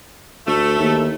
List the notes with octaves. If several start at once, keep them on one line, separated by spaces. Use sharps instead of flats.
D2 A3
D#2